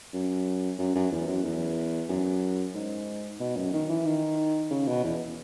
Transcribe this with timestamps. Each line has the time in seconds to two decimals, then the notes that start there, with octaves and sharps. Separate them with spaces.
0.13 F#2
0.78 F#2
0.96 F#2
1.12 E2
1.27 F#2
1.44 E2
2.09 F#2
2.74 G#2
3.40 B2
3.56 F#2
3.73 D#3
3.89 E3
4.06 D#3
4.71 C#3
4.88 B2
5.04 E2